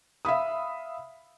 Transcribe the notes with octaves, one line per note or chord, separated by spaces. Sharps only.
E5 F5 B5 D#6